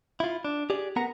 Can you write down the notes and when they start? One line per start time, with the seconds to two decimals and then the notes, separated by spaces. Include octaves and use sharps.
0.20 E4 F4
0.45 D4
0.70 G4 G#4 D5
0.96 B3 A#4 F#5 A#5